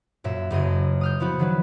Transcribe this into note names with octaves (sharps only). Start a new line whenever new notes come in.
F#2 A#2 E5
F#1 F#2 C#3 D#5
D#6 F6 G6
F3 B3 E4 F#4
D#3 F#3 B4